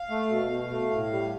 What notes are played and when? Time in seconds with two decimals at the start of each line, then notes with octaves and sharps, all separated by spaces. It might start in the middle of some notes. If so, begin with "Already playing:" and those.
Already playing: F5
0.10 A3
0.30 B2
0.50 B2
0.71 A3
0.91 A2
1.11 G3